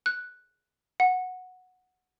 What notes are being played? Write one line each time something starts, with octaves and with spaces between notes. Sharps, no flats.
F#6
F#5